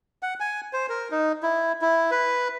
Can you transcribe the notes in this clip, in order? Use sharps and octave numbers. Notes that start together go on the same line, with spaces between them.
F#5
G#5
C5
A#4
D#4
E4
E4
B4